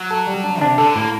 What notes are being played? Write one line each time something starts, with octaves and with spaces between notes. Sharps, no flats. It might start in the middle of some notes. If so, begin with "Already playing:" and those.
Already playing: F#3
A4
G3
D4
C3 D4
D3 A4
A2 A#3